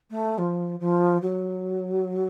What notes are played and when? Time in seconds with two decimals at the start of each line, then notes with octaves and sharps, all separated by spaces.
0.10 A3
0.38 F3
0.80 F3
1.22 F#3